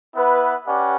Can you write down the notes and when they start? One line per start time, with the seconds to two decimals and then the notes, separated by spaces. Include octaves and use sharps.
0.14 B3 E4 B4 F#5
0.66 C#4 G4 B4 D5 F#5